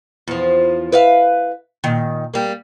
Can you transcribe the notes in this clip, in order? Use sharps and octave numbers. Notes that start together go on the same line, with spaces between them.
E2 F3
B4 E5 F5
A#2 D#3
G3 A#3